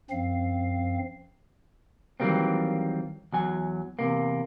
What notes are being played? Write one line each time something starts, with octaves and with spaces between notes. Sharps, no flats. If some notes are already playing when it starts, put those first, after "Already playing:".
F#2 F3 C4 F5
D#3 E3 F#3 G3 A#3 C4
E2 F#3 G#5
E2 G2 C3 A#3